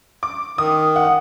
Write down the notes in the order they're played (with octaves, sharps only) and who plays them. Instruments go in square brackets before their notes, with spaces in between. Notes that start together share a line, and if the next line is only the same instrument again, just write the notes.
[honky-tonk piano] D6
[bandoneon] D#3 [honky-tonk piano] D#6
[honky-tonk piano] F#5